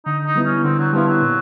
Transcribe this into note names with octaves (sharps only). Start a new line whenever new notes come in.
D3 D#4
D#4
G3 B3 E4
C#4
D3 C4
F#3
F3 G3 B3 E4
F#3
A#2